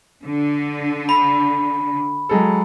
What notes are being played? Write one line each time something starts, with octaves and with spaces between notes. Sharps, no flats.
D3
B5
F#3 G#3 A4